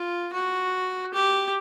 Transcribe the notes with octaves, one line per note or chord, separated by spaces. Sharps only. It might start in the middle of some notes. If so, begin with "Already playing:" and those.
Already playing: F4
F#4
G4